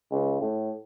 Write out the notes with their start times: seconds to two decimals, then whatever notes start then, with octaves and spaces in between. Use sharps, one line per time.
0.11 C#2
0.41 A2